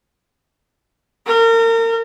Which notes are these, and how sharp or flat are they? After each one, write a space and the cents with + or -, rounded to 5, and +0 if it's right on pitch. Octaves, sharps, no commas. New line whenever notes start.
A#4 -35